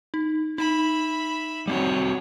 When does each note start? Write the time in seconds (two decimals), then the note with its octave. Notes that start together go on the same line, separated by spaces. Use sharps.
0.14 D#4
0.58 D#4 E5 B5
1.68 G3 C4 F#4 C#5